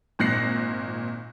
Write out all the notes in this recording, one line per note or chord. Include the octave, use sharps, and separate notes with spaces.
G#1 A#2 F#6 A#6 C7